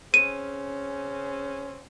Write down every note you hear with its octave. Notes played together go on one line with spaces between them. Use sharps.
C#3 C4 C#4 D#7